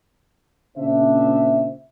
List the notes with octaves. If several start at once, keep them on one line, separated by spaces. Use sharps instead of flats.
A#2 C#3 C4 D4 C5 E5